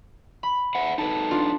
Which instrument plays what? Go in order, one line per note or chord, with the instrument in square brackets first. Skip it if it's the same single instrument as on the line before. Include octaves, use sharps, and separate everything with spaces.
[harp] B5
[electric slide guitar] C5 E5 F#5
[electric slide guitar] D#4 A4 B4 [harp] A5
[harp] D4 F4